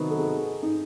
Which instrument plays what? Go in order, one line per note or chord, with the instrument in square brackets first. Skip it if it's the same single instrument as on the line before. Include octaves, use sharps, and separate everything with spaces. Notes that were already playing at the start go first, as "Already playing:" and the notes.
Already playing: [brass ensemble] C3 D#3 F#3 B3 D#4 [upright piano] A#4
[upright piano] A4
G#4
D#4